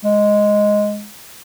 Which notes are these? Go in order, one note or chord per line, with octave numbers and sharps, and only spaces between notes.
G#3